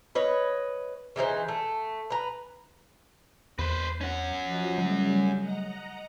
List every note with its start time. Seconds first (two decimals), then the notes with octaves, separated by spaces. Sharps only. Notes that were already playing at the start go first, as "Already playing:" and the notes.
0.15 B4 C#5 D#5
1.16 C#3 E3 D#4 C5
1.48 A3
2.10 B4 A#5
3.59 E2 B4 C5
4.01 C#4 F#5
4.44 F3 F#4 D#5
4.78 C#3 F#3 G3 A3
5.36 D#5 F#5 A#5